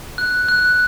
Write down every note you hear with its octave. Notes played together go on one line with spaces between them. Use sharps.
F#6
F#6